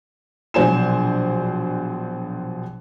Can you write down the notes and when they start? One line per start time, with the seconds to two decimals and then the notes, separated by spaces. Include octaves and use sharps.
0.54 A#1 B2 F#3 C5 G#5 E7